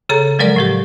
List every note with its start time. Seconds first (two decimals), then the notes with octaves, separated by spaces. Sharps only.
0.09 C#3 G#4 A4 A#5
0.39 F3 F#3 G#3 A#4 D5
0.56 A2 F3 G4